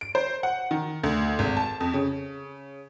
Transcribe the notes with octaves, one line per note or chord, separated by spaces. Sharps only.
D7
C5
F#5
D#3
D2
G#1
A5
F2
C#3